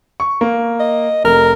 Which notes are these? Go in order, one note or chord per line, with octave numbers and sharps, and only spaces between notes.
C#6
A#3
D#5
F1 A#4